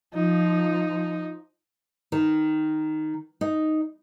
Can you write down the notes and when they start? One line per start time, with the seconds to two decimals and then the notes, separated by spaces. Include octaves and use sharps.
0.14 F3 D#4
2.12 D#3
3.41 D#4